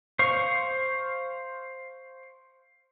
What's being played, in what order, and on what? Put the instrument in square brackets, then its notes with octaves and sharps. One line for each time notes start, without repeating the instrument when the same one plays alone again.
[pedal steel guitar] C5 F5 C#6